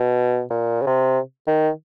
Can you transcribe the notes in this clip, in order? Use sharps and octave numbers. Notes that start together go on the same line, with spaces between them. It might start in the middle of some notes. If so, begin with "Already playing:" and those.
Already playing: B2
A#2
C#3
C3
D#3